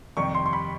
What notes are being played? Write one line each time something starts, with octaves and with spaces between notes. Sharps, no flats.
F2 C3 D#3 G3 C#6
C6
C6
B5